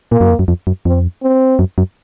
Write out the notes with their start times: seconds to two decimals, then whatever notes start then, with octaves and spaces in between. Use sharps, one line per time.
0.11 A#2 A#3
0.21 F#2
0.30 F2
0.39 F#2
0.48 F2
0.67 F#2
0.85 F2 C4
1.23 C4
1.59 F#2
1.78 F#2